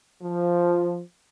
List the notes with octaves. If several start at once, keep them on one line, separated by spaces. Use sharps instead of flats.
F3